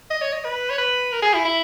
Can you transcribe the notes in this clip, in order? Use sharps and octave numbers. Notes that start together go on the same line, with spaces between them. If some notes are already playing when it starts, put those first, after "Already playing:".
D#5
C#5
D#5
B4
C#5
B4
A#4
G#4
E4
E4